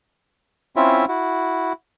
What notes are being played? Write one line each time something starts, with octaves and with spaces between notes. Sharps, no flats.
C4 C#4 E4 F4 E5
E4 F#4